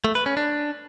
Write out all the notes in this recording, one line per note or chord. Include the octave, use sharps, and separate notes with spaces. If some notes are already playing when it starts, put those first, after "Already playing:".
A3
B4
C#4
D4